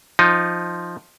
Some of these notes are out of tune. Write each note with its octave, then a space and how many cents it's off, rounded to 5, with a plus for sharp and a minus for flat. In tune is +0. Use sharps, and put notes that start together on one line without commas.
F3 +0 D#4 +0